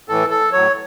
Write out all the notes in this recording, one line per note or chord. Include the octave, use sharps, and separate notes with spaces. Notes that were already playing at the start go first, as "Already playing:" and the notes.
A2 E3 A4
A4
A2 F#3 C#5